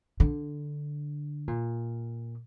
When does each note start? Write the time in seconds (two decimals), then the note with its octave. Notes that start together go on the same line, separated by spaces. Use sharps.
0.20 D3
1.48 A#2